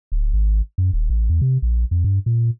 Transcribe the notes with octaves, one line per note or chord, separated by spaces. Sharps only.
D1
G#1
F#2
D#1
A1
E2
C3
A#1
F2
G2
A#2